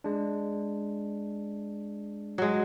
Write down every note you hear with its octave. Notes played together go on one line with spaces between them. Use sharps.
G#3 D4
F#3 G#3